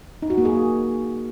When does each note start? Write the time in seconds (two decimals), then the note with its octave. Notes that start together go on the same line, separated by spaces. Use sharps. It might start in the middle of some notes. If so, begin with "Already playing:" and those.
0.22 D#4
0.30 F#4
0.38 A#3
0.45 G#4